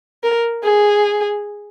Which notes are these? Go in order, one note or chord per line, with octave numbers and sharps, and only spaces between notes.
A#4
G#4